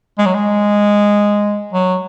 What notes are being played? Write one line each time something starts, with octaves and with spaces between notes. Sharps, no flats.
G#3
F#3
G#3
F#3